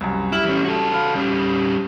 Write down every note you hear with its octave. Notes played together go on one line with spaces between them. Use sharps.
C2 F#2
G3 E4 F6 F#7
E3 C#4
F#4 A4
F5 B5 F6
G3 C#4